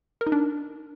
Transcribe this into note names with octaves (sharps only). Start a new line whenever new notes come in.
A#4
D#4
D4